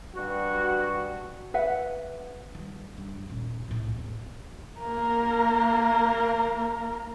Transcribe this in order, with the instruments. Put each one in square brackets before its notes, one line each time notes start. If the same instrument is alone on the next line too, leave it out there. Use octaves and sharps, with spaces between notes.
[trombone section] G2 F#4
[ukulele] B4 E5 F#5
[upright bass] D#3 G3
G2
D#1
C2 A2
E2
[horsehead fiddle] A#3 A#4